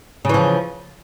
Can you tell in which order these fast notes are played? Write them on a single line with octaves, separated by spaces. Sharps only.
C#3 E3 F3